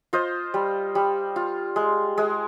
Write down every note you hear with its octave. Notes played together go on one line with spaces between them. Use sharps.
F4 C5 D#5
G3
G3
F4
G#3
G#3